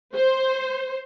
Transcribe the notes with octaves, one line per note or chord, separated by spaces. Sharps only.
C5